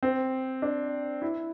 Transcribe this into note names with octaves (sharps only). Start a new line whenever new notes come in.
C4
D4
E4